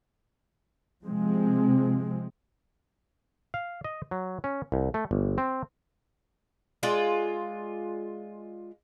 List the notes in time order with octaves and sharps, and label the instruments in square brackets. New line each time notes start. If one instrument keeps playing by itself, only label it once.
[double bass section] C3 F3 G#3 C4
[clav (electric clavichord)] F5
D#5
F#3
C#4
C2
A3
G1
C4
[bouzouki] G#3 F4 D5